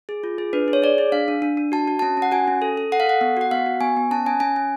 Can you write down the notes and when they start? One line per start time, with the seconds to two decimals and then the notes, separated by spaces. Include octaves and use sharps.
0.09 G#4
0.23 F4
0.38 G#4
0.53 D4 B4
0.68 G#4
0.73 C#5
0.82 G#4 D5
0.98 G#4
1.12 D4 F5
1.28 D4
1.42 D4
1.57 D4
1.72 F#4 A5
1.88 F#4
1.99 C#4 A5
2.17 C#4 F#5
2.32 F#4 G#5
2.48 C#4
2.62 A4
2.77 A4
2.92 A4 F#5
3.00 F5
3.07 A4 F#5
3.21 B3
3.37 F#4 F#5
3.51 B3 F5
3.66 F#4
3.81 B3 G#5
3.97 B3
4.11 C#4 A5
4.26 C#4 G#5
4.40 C#4 G#5
4.56 C#4